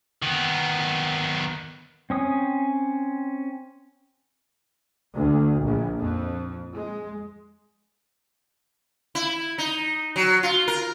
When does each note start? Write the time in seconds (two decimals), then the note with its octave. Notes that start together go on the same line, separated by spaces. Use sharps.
0.22 D#3 B3
2.10 C4 C#4 D#6
5.14 D2
5.60 A#1
5.98 F2
6.75 G#3
9.15 E4
9.58 D#4
10.16 F#3
10.43 F4
10.68 A#4